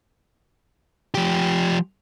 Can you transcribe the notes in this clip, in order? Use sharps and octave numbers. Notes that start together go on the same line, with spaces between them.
F3 G4